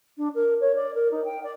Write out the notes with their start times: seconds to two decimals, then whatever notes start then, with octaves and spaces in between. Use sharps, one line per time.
0.17 D4
0.34 A#4
0.60 C#5
0.75 D5
0.94 A#4
1.11 D#4
1.24 G5
1.43 D5